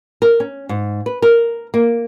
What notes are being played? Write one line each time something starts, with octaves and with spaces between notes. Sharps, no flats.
A#4
C#4
G#2
B4
A#4
A#3